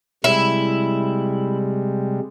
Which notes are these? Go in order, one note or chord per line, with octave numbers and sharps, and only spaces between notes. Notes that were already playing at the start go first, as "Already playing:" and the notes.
C3 G3 G#3 E4